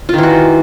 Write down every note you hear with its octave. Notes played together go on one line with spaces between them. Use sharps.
D#3 E3 F4 F#4